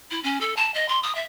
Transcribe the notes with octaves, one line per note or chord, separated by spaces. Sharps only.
E4
C#4
A4
A5
D#5
C6
D#6
E5